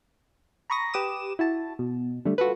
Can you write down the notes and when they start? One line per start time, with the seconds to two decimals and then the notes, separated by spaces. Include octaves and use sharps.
0.70 A#5 B5 C#6 D#6 A#6
0.94 G4 B4 D6 D#6 E7
1.39 E4 F#4 A5
1.79 B2
2.25 D3 G3 A3
2.38 F4 F#4 A4 B4